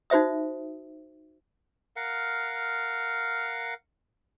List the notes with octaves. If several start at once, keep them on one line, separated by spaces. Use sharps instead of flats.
D#4 F#4 C5 E5 D#6
A#4 F5 F#5